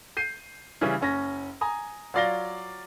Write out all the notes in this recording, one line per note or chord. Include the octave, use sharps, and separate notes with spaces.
G6 C7 D#7
C#3 E3 G3 C#4
F#1 C#4 A#6
G#5 A#5 D#6
F#3 F4 D5 F5 A#6 G7